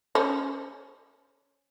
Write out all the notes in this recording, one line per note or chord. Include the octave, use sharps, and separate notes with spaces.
C#4 C5